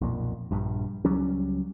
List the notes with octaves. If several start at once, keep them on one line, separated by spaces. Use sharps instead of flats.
B1 F2 A#2
A#1 G2
C#2 F#3 G3 C#4